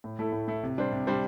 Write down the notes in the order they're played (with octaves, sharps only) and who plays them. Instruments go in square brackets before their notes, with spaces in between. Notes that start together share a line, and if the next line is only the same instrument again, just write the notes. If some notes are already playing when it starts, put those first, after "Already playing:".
[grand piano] A2
A3 E4 A4
A2
A3 E4 A4
C3
G3 D4 C5
C3
G3 D4 C5